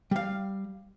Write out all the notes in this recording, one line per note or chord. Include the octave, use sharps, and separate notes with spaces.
G3 F5